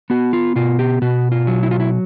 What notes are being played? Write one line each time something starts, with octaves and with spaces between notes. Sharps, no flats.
B3 F#4
F4
B2 F4
G4
B2 F#4
F4
F#3
E4
F4
E4